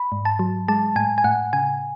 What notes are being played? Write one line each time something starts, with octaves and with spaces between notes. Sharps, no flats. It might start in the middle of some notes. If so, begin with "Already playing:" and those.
Already playing: B5
G#2
A5
F#3
G#3 A5
A2 G#5
G#5
A2 F#5
C#3 G#5